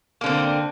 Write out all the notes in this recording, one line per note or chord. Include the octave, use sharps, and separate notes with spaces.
D3 A#3 C4